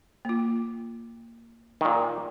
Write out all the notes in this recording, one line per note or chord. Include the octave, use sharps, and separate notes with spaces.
A#3 F4
A#2 D#3